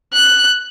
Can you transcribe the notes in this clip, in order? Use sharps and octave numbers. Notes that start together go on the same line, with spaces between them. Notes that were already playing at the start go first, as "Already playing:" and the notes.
F#6